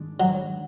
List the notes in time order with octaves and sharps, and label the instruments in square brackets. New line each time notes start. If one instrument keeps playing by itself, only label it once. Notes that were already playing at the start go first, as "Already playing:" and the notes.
Already playing: [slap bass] G#2 D#3 G#3 D4
[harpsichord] F#3